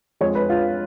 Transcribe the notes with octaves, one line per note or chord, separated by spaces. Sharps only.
F2 F3 G#3 C#5
B4
F4